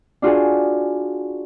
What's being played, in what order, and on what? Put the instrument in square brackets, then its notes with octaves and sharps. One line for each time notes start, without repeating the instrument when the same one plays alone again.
[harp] D4 F4 F#4 G#4